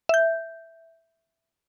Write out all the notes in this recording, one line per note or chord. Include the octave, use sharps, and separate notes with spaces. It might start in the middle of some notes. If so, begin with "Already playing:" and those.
E5 G6